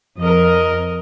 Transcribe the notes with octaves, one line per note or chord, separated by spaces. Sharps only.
F2 A#4 D#5